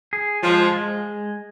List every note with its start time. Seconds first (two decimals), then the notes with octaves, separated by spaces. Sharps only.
0.13 G#4
0.42 F3 G#3
0.72 G#3